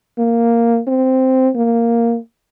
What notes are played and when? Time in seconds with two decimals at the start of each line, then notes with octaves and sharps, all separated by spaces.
0.18 A#3
0.87 C4
1.55 A#3